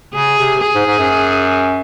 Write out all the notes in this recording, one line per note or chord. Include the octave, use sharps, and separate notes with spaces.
C#3 G#4
C3
G#4
G#2
G#2
F#2